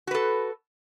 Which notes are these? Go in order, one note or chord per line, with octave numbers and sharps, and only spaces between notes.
F#4 A4 B4